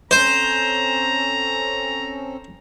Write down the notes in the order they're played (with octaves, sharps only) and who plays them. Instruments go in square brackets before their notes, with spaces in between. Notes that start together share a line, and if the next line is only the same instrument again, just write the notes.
[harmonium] C4 C#4 A4 [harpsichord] C5 [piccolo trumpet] A#5